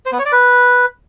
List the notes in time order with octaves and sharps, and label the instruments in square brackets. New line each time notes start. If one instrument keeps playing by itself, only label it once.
[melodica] C5
B3
C#5
D5
B4